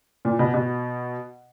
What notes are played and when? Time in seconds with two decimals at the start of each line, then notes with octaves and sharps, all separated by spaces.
0.25 A#2
0.39 B2
0.54 B2